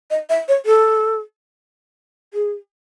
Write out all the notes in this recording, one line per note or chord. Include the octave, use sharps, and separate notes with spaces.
D#5
E5
C#5
A4
G#4